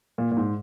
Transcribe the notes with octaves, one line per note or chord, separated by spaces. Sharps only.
A#2
A#2
G#2